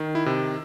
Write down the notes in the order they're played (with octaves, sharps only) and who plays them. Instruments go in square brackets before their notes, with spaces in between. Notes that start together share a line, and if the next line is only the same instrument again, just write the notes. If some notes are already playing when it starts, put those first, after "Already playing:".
Already playing: [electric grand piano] D#3
E4
C3